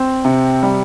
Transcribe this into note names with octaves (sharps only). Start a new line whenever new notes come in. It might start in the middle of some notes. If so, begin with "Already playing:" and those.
Already playing: C4
C3
G3